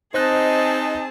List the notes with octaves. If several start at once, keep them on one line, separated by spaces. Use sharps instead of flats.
C4 D#4 G#4 C5 D#5 A5 F#6